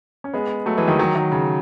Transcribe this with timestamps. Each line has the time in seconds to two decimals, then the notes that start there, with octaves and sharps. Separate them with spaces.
0.24 C#4
0.33 G#3 B3
0.66 F#3 A3
0.77 E3 G#3
0.88 D#3 F#3
0.99 D#3 F#3
1.15 D#3 F#3
1.32 C#3